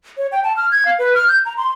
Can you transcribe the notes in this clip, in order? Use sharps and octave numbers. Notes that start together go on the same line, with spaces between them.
C#5
G5
A5
F6
G#6
F5
B4
F6
G6
A#5
C6